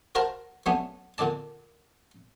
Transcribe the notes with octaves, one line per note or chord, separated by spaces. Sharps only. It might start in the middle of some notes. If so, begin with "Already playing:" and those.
F#4 A#4 C5 F5 A5 A#5
F#3 A3 B3 C#4 D4
A#2 D3 D4 D5 A5